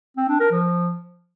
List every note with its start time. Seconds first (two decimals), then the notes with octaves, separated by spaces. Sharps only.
0.17 C4
0.28 D4
0.40 A#4
0.51 F3